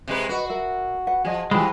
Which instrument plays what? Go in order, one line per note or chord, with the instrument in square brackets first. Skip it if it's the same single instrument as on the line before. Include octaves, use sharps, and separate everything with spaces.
[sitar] C3 G#3 B4
[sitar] F#4 [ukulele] B4 D#5
[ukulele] A#4 E5
B4 F#5
[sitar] F3 [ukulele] G#4 D#5
[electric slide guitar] E3 G#3 [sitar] F3 [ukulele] G4 G5 B5